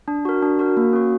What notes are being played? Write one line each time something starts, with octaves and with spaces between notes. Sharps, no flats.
D4
F#4 A#4
D4
F#4 A#4
A#3
C#4 F#4